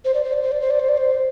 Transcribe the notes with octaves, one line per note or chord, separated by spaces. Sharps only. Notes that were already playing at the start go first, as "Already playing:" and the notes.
C5
D5
C5
D5
C5
D5
C5
D5
C5
D5
C5